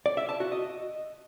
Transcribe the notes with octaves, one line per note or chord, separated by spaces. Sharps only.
D5
E5
A5
F#4
D#5